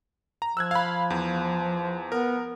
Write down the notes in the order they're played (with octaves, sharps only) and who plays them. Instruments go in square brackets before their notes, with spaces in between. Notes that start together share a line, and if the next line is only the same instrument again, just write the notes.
[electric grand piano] A#5
[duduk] F3 [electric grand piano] E6 F#6 G#6
[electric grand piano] F5 B5
E2
[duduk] B3 [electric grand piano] A#4